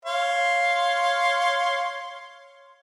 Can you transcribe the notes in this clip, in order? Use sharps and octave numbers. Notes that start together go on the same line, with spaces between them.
C#5 F5 C6